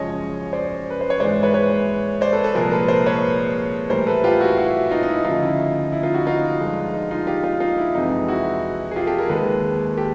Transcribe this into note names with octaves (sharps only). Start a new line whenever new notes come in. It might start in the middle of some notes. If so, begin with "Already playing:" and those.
Already playing: F#2 C#3 F3 G#3 C#5 D#5
C5 D5
B4
C5
C#5
G#2 E3 G#3 C5 D5
B4 C#5
B4 C#5
C5 D5
A4 B4
A4 B4
C2 A#2 F3 G#3 G#4 A#4
A4 B4
A#4 C5
B4 C#5
A2 E3 G3 A#4 C5
A4 B4
F4 G4
E4 F#4
E4 F#4
D#4 F4
D#4
E4
D2 C#3 F3 D#4 F4
E4
E4
D#4 F4
E4 F#4
D#4 F4
G2 D3 F3 G#3
D#4
D#4 F4
F4 G4
D#4 F4
D#4 F4
E4
F2 C3 E3 G#3 D#4
E4 F#4
G#4
F4 G4
G4 A4
G#4 A#4
D#2 D#3 G#3 A4 B4
G4 A4